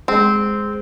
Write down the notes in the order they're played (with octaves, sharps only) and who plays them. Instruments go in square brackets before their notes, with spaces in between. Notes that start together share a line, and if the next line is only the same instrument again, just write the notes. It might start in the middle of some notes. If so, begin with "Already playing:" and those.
[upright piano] G#3 [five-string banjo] C4